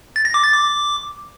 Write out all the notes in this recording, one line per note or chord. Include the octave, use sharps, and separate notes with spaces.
A6
A#6
D6
A6
D6